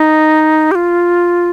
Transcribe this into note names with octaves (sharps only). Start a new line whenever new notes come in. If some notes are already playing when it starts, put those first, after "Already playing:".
Already playing: D#4
G4
F4